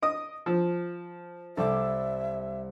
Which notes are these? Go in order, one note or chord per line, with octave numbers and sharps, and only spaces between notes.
D#5 D#6 D7
F3
C2 G3 A4 E5 D6